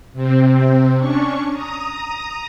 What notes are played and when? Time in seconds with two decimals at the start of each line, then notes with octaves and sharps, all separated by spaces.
0.13 C3 C4
0.97 C#4 D4 C#6
1.52 A#5 D#6